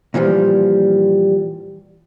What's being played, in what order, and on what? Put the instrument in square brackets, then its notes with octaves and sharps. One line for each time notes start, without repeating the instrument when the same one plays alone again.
[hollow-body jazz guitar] A#2 E3 F3 G3